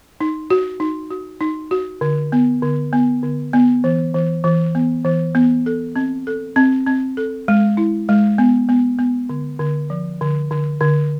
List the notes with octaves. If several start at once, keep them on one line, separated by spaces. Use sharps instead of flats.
D#4
F#4
D#4
F#4
D#4
F#4
D3
B3
D3
B3
D3
B3
E3
E3
E3
B3
E3
B3
A4
C4
A4
C4
C4
A4
G#3
E4
G#3
B3
B3
B3
D3
D3
F3
D3
D3
D3